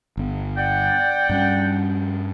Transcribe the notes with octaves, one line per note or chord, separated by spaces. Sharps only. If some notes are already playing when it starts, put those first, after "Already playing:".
G1 B3
D5 F#5 G5
G2 G3 C#4